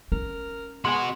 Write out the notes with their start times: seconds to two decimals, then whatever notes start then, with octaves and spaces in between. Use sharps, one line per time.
0.12 C#4 A#4
0.85 G#3 B3 F#4 G#5 C6